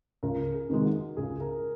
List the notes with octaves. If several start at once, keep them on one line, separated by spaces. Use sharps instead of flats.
C#2 A#4
G#4
C3 D#3 G#3
F#4
C#2 G#4
A#4